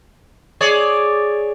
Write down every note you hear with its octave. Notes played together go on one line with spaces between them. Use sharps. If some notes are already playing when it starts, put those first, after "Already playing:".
G#4 C#5 D5